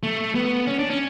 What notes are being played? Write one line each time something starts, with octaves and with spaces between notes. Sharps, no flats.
A3
B3
C#4
D4
C#4